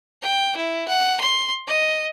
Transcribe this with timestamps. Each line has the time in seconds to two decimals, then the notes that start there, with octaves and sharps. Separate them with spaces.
0.22 G5
0.56 E4
0.88 F#5
1.20 C6
1.67 D#5